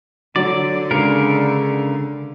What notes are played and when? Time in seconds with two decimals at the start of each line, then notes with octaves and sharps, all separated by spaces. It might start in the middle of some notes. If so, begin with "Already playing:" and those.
0.36 D3 F#3 D5
0.91 C#3 G#3 A#4